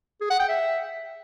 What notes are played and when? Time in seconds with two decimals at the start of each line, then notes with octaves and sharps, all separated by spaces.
0.21 G#4
0.30 F#5
0.40 G5
0.49 E5